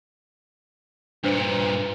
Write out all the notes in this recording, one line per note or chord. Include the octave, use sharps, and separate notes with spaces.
G2 A#2 D4 B4 C5